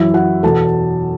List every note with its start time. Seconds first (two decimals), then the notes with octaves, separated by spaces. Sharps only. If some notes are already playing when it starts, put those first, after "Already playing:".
Already playing: F#2 E3 E4 E5
0.14 F#4 F#5
0.43 E2 B2 A4 A5